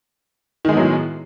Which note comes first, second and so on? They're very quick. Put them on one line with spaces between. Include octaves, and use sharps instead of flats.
D#3 G#3 B3 F#3 A2